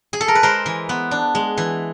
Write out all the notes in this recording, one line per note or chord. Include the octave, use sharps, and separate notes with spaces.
G#4
A4
A#4
B4
G#3 A#4 C5
E3
B3
D4
G#3
E3